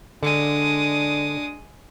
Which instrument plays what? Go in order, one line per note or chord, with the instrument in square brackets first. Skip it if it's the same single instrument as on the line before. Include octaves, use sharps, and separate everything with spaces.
[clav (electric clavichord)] D3 [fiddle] G#3 D#6 [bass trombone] D4